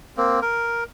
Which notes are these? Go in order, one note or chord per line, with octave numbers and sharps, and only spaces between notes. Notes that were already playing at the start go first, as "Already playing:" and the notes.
A#3 C4
A#4